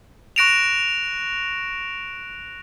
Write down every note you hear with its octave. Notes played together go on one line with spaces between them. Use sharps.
C#6 F#6 A#6 D7 E7 F7